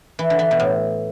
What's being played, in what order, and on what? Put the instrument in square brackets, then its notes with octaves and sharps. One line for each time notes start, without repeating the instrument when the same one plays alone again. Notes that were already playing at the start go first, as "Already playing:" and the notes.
[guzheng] E3
D3
E3
B2
A2